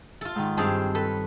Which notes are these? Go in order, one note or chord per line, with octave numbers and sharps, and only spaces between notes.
F4 A4
G#2 D#3
G2 C4 G#4 D#5 A5
A4 B4